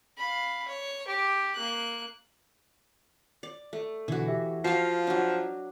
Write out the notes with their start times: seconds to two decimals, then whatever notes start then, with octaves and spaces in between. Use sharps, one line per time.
0.18 F5 B5
0.68 C#5
1.07 G4
1.54 A#3 F#6
3.43 D5
3.73 A3
4.08 B2 D3 E3 F#4
4.28 G4 E5
4.64 F3 F#4 F5 C7
5.07 F#3 D4